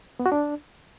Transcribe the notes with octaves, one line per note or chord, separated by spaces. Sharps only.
B3
F#4
D4